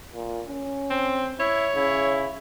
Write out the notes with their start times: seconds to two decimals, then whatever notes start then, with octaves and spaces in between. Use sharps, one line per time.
0.13 A#2
0.48 C#4
0.90 C4
1.40 E4 C#5
1.76 C#3 E4